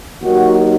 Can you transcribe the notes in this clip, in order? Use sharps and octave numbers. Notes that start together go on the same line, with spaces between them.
D#2 D#3 F#3 F#4